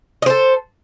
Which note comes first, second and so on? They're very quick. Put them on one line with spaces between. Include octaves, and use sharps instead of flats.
D#5 C5 A4